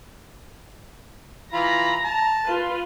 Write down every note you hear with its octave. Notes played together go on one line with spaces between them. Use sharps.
E3 F4 A#5 B5
A5
F4 B4